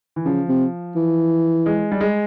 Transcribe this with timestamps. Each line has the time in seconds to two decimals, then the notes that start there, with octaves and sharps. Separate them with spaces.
0.16 E3
0.26 C#3 F3
0.49 C3
0.96 E3
1.66 G#3
1.92 G3
2.01 G#3